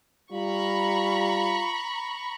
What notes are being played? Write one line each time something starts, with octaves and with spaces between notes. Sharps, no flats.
G3 F4 A#5 B5 C#6